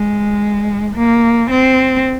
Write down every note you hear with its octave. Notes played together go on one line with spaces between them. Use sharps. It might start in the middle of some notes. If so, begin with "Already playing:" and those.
Already playing: G#3
A#3
C4